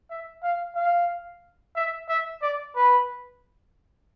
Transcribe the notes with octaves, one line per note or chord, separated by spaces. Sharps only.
E5
F5
F5
E5
E5
D5
B4